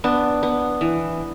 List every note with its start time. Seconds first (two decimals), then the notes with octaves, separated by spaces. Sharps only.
0.04 B3 D4
0.43 B3
0.81 E3